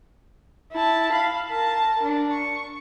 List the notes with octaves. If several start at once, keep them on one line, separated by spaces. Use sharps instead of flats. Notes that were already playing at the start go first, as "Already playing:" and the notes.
E4 A5
F5 B5
A#4 A5
D4
C#6